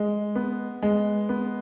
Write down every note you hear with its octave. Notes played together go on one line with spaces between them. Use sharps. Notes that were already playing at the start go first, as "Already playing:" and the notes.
Already playing: G#3
B3
G#3
B3